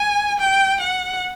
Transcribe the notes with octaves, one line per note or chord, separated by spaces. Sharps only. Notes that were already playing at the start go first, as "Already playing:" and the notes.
Already playing: G#5
G5
F#5